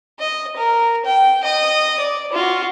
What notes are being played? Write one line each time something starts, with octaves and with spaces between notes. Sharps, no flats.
D#5
A#4
G5
D#5 D#6
D5
F4 F#4